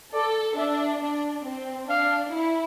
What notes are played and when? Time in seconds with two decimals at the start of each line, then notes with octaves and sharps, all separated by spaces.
0.13 A4 D5
0.57 D4 E5
1.01 D4
1.45 C4
1.89 D4 F5
2.33 E4